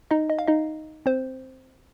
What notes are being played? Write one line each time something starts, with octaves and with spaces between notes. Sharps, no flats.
D#4 D#5
D#5
F5
D#4 D#5
C4 C5